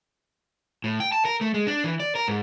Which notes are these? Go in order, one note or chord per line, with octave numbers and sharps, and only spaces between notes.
A2
G5
A5
A#4
A3
G#3
D4
E3
D5
A#4
G#2